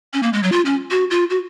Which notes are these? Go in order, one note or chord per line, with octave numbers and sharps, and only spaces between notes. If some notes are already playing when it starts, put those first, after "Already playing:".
C#4
A#3
G#3
F#3
F4
C#4
F#4
F4
F#4